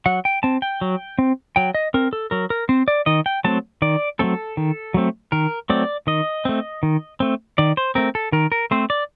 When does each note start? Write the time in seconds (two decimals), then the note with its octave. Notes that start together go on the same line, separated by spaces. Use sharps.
0.06 F#3 F#5
0.25 G5
0.43 C4 A5
0.62 G5
0.81 F#3
1.19 C4
1.56 F#3 G5
1.75 D#5
1.94 C4 A#4
2.13 A4
2.31 F#3 A#4
2.50 A#4
2.69 C4 C5
2.88 D5
3.06 D#3 D#5
3.26 G5
3.44 F#3 A3 C4 A5
3.82 D#3 D5
4.19 F#3 A3 C4 A4
4.57 D#3
4.94 F#3 A3 C4
5.32 D#3 A#4
5.70 F#3 A3 C4 D5
6.07 D#3 D#5
6.45 A3 C4
6.83 D#3
7.20 A3 C4
7.58 D#3 D5
7.77 C5
7.95 A3 C4 A#4
8.15 A4
8.32 D#3 A#4
8.52 A#4
8.71 A3 C4 C5
8.90 D5